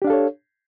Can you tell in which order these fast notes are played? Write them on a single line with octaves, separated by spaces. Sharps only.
G4 D4 F5 A4 C#5